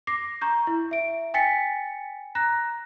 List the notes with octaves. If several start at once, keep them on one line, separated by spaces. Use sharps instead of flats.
D6 A#6 C7
A#5 C#6 G6
E4
E5 D7
G5 G#5 A6 B6 C#7
A#5 F#6 A#6